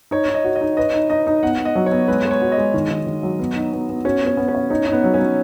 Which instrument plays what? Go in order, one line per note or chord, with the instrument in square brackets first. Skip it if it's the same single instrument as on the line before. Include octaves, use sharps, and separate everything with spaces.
[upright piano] D#4 [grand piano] C#5
[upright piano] D#4
[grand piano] D#5
[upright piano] F#4
[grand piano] D#5
[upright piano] D#4
[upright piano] B4 [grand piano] D#5
[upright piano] D#4
[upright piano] D#4 [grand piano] D#5
[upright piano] D#4
[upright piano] B3 [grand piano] F#5
[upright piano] B3
[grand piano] D#5
[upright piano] F#3
[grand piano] C#5
[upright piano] B3
[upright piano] G#3 [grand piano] B4
[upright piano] G#3
[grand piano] C#5
[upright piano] F#4
[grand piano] D#5
[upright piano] G#3
D#3
D#3
D#3
F#3
B3
D#4
B3
B3
[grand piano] C#4 [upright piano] F#4
[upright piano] B3 [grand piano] C#4
[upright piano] B3
[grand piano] C#4
[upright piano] C#5
[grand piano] C#4 [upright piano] D#4
[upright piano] D#4
[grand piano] B3
[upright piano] F#3
[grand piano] C#4
[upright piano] F#3